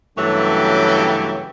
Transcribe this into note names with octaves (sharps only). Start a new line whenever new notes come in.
G2 C#3 E3 F#3 A3 G4